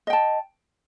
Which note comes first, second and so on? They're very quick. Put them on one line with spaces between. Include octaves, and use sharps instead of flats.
D#5 G5 A5